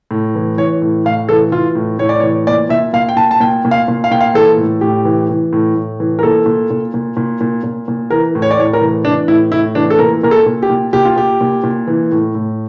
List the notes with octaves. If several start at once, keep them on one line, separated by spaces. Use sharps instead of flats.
A2
E3
E3 C#5
A2
A2 F5
E3 A4
E3 F4
A2
A2 C#5
D5
E3 C#5
A#2 D5
A#2 E5
A#2 F5
G5
A#2 A5
A5
A#2 G5
A#2
F5
A#2
F5
A#2 G5
F5
E3 A4
A2
A2 G4
E3
E3
A2
A2
E3
A#4
A#2 A4
A#2
A#2
A#2
A#2
A#2
A#2
A#2
E3 A#4
A2
C#5
D5
A2 C#5
A#4
E3
E3 D4
A2 E4
A2 E4
E3 D4
A4
A#2 A#4
A#2 A#4
A4
A#2
G4
A#2
A#2 G4
F4
A#2 G4
A#2
A#2
E3
A2
A2